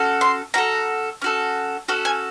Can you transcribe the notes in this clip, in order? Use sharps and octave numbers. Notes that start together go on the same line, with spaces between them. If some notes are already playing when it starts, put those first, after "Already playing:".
Already playing: C#4 F#4 A4
C6
C#4 F#4 A4 A#5
C#4 F#4 A4
C#4 F#4 A4
G#5